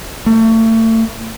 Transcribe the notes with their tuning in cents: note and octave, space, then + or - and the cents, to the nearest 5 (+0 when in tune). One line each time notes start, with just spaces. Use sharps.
A3 +35